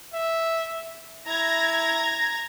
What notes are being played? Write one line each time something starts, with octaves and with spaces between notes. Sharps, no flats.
E5
E4 A#5 G#6 A#6